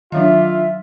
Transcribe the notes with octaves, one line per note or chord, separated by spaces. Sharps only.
D#3 F#3 D4 F4 E5 F5